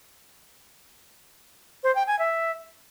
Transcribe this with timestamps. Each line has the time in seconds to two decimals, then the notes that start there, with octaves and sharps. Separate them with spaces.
1.84 C5
1.95 G5
2.07 G#5
2.19 E5